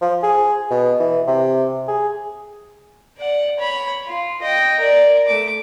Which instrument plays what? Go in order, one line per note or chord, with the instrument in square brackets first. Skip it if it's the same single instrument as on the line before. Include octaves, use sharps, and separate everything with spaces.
[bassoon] F3
G#4
B2
E3
C3
G#4
[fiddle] D5 F#5
C#5 B5
F4
D#5 G5
A#4 D5
A3 D6